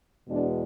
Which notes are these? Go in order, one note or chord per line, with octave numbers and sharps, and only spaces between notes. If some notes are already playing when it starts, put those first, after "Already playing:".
E2 B2 G#3 B3 D4